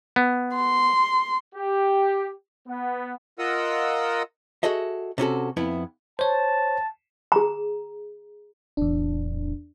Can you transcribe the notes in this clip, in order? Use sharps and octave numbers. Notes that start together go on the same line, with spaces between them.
B3
C6
G4
B3
F4 A#4 D#5 F#5 D#6 E6
F#4 G#4 A4 D#5 E5
C3 C#4 F#4 A4
F2 B3 E4
C5 C#5 A5
G#4 A#5
D1 E2 D4